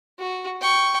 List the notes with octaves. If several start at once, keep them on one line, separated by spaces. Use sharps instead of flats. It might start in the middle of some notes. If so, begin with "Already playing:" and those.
F#4
G5 C#6